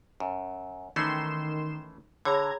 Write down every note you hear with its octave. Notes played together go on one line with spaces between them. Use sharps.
F#2
D#3 E3 A3 C#4 C6 E7
D3 G#4 C#5 A#5 B5 G#6